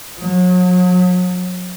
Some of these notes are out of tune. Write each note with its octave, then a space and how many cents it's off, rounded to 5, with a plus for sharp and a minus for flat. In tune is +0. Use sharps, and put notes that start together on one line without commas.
F#3 -35